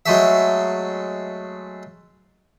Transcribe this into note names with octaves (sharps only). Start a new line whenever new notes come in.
F#3 G#3 A3 E5